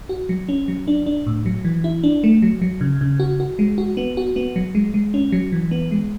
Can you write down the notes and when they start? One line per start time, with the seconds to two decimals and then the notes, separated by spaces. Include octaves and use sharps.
0.09 F#4
0.29 F#3
0.49 C#4
0.68 F#3
0.88 D4
1.06 D4
1.27 A2
1.46 F#3
1.65 E3
1.84 E4
2.03 D4
2.24 A3
2.42 F#3
2.62 F#3
2.81 C#3
3.01 C#3
3.20 F#4
3.40 F#4
3.59 G#3
3.78 F#4
3.97 B3
4.17 F#4
4.36 B3
4.56 F#3
4.75 G#3
4.94 G#3
5.14 C#4
5.32 F#3
5.52 E3
5.71 B3
5.91 G#3